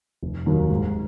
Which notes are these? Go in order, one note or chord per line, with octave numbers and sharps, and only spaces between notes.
F1
D#2 D#3 F#3
G#2